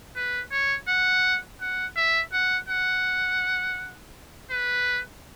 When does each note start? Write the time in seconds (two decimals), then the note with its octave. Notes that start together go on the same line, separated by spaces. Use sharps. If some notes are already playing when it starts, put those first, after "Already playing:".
0.16 B4
0.51 C#5
0.88 F#5
1.61 F#5
1.96 E5
2.33 F#5
2.69 F#5
4.50 B4